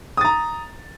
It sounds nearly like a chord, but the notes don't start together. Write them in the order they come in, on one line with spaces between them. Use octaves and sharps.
D#6 A6 A#5